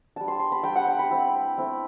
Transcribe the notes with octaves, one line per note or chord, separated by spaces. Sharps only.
G3 D4 A5
C6
C6
B5
G3 D4 G5
F#5
G5
B5
A3 C4 E4
A3 C4 E4